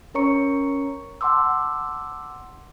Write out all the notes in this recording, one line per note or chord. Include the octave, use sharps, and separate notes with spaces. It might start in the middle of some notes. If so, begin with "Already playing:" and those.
C#4 A#4 C#5 A#5 C#6 C#7
F#5 A5 C6 D6 E6